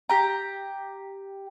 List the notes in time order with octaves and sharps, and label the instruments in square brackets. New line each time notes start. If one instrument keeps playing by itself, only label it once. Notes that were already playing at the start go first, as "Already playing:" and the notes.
[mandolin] G4 A#5